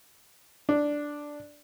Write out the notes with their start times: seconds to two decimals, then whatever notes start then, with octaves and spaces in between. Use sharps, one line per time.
0.69 D4